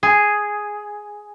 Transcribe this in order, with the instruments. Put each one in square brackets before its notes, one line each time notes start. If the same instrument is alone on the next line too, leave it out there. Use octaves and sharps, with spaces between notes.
[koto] G#4